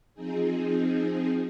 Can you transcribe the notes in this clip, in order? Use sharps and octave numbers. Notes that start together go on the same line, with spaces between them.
F3 C4 D#4 G#4